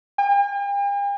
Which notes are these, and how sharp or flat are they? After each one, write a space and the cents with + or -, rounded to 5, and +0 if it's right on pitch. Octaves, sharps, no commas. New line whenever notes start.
G5 +45